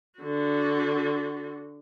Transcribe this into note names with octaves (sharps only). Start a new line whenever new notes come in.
D3 F#4